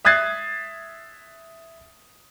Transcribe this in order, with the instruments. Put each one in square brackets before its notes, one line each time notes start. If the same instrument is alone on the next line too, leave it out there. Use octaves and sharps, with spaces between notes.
[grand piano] E5 D#6 F#6 G#6 A6 C7